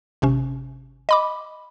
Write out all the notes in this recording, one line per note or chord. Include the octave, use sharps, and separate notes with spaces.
G#1 C3 C#4
D#5 B5 D6